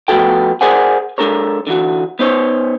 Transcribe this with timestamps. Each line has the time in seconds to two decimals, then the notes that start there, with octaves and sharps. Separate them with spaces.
0.08 F3 A3 B3 F#4 A4 G5
0.61 G#4 A#4 C5 D5 F#5 G#5
1.18 G#3 D4 A4 A#4 C#5
1.67 D3 E3 F#4
2.19 B3 D#4 C5 C#5